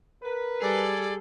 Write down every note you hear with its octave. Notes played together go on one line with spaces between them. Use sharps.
A#4 B4
G3 G#4 A4 D5